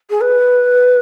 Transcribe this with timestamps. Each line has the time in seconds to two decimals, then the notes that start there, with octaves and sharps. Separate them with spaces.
0.10 G#4
0.21 B4